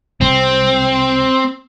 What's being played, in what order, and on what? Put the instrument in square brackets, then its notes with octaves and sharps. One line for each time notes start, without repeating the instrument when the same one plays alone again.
[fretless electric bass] C2 [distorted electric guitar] C4